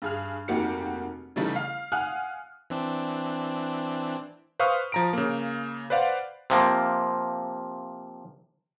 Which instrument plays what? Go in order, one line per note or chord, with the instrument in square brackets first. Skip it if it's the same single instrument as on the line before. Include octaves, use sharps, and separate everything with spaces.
[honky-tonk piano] G2 G#4 F6
F1 D#3 A#3 F#4 G4 C#7
C#3 E3 G3 A3 D#4
F5
F5 F#5 G#5 D#6 F6 F#6
[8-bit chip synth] E3 C4 D4
[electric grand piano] B4 C5 F5 C#6 D#6 F6
F3 A#5 D7
C#3 A#3
B4 C5 D5 F5 F#5
[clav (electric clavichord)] C3 F3 A#3